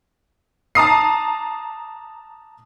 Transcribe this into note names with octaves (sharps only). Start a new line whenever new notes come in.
A5 A#5 D#6 C7